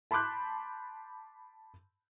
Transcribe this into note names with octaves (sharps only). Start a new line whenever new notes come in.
A5 B5 C6 D6 F#6 G6